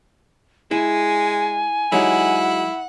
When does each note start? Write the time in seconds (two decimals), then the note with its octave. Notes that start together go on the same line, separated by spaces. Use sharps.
0.71 G#3 E4 G#5
1.92 F#3 G#3 D#4 E4 F#5